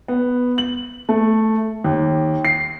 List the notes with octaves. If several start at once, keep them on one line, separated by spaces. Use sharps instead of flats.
B3
F#7
A3
D#2
C7